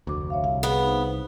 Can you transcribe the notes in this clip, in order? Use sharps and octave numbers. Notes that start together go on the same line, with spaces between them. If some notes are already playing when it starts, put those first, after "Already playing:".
F1 D2 F#4 D6
C#5 E5 F5
C2 F5
B3 G#4
D#4 C5